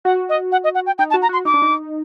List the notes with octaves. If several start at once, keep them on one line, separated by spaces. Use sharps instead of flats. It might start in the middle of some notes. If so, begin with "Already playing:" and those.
F#4 F#5
D#5
F#5
D#5
F#5
G5
D#4 G5
A5
F#4
A#5
F#4 C6
D#4 D6
D4
D#4